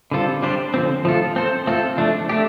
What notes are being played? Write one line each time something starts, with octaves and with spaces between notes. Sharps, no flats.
D3 G3 C4 F4 A4
G3 D4 G4 C5
D3 F3 C4
F3 A3 F4 A4
C4 A4 C5
A3 C4 F4 A4
F3 A3 D4
A3 D4 G4